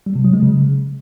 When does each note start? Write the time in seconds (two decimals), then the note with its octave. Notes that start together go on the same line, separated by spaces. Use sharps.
0.06 G3
0.15 C3
0.25 F#3
0.34 G#3
0.43 C#3